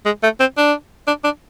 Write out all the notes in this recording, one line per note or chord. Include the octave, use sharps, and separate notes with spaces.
G#3
A3
C4
D4
D4
D4